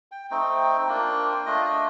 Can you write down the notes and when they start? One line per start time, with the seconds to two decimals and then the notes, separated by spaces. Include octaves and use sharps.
0.12 G5
0.31 A3 C4 D#4 G5
0.88 A#3 D4 F4
1.46 A3 D4 F4 D#5
1.65 D#5